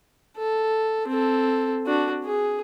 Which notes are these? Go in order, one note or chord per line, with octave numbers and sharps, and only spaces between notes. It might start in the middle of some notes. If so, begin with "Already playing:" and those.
A4
C4 A4
D4 F#4
G#4